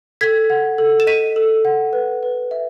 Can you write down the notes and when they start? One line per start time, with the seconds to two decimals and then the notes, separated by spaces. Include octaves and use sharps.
0.21 A4 G#6 B6
0.50 F#5
0.78 A4
1.00 E7
1.07 D#5 B6 D#7
1.36 A4
1.65 F#5
1.93 B4
2.23 B4
2.51 E5